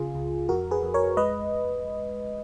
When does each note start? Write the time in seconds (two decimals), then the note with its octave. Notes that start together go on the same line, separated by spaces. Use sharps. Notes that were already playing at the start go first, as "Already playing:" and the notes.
Already playing: C#3 F4 G#4
0.15 C#2
0.49 F2 F#4 A#4
0.71 G#4 B4
0.82 F2
0.94 A#4 C#5
1.17 G#3 B4 D#5